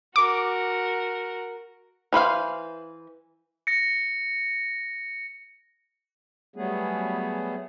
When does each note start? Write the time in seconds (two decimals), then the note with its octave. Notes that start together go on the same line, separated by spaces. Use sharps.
0.16 F#4 A#4 D6
2.13 E3 B4 C5 F5
3.67 A#6 C#7
6.56 F#3 G3 A3 B3 G#4